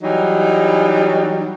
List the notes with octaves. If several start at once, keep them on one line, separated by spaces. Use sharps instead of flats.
E3 F#3 G3 D#4